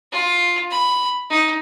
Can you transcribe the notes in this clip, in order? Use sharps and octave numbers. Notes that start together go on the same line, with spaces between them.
F4
B5
D#4